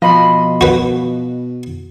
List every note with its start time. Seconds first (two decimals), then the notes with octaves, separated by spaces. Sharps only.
0.02 B2 F3 D#5 B5 C6
0.61 F#4 B4